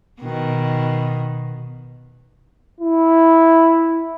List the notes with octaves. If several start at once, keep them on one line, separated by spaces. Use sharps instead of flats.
B2 D#3
E4